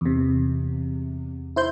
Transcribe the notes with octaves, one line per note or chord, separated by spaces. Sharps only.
E2 C3
E4 C5 G6